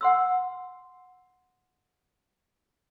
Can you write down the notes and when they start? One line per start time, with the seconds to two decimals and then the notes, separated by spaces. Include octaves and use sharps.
0.01 F#5 C6 E6